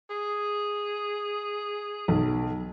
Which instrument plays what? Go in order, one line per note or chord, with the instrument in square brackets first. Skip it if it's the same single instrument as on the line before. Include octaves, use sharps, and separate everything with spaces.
[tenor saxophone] G#4
[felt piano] B1